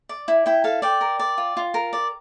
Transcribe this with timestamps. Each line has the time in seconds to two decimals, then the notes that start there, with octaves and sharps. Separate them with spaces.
0.09 D5
0.28 E4
0.46 E4 G5
0.64 A4 F5
0.82 D5 G5
1.01 A#4
1.19 D5
1.38 F4
1.57 F4
1.74 A#4
1.93 D5